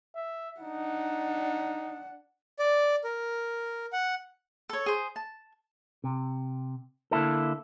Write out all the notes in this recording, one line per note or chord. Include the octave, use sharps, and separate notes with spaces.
E5
D4 D#4 F#5
D5
A#4
F#5
A4 C#5
G#4 C5
A5
C3
D3 A#3 E4 A4